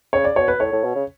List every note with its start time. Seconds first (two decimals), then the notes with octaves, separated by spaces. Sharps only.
0.13 C#3 C#5
0.24 D5
0.36 B2 C#5
0.48 B4
0.60 A2 C#5
0.72 A2
0.84 B2
0.95 C#3